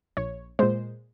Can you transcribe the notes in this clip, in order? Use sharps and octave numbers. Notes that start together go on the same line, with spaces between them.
A#1 C#5
A#2 G#3 C5